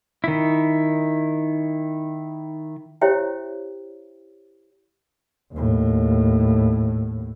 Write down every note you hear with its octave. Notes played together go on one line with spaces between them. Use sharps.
D#3 E4
E4 G4 C5 C#5 E5 G5
D#2 A2